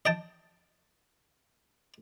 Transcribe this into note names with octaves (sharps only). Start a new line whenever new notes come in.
D#5 G5 A5